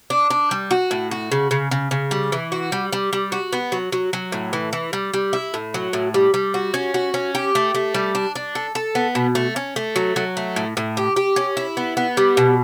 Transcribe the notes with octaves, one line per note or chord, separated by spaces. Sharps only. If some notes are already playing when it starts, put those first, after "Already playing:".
D4
D4
G3
F#4
A2
F#4
C#3
C#3
C#3
C#3
G3
E3
F#4
G3
G3
G3
F#4
B3
F#3
F#3
F#3
A2
E3
E3
G3
G3
E4
A2
F#3
A2
G3
G3
F#4
C#4
F#4
C#4
G4
A3
A3
G3
D4
D4
A4
A4
B3
B2
A3
C#4
A3
F#3
F#3
A3
A2
A2
G4
G4
C#4
E4
B3
B3
G3
B2